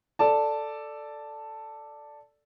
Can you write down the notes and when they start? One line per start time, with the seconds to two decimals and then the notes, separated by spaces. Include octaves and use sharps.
0.19 A4 D5 A5